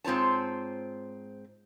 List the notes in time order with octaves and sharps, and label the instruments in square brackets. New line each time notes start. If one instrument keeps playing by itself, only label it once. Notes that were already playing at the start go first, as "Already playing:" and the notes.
[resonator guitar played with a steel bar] G#2 C4 F4 C#5 A5